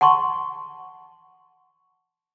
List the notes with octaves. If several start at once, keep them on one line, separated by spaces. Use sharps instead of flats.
F#5 A5 C6 C#6